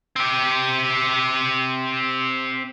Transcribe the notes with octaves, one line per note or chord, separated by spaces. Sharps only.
C4 G4